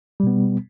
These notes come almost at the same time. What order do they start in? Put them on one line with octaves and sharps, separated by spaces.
G3 B2 B3